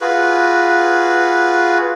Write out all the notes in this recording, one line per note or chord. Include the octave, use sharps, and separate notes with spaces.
F4 F#4 G#4 B4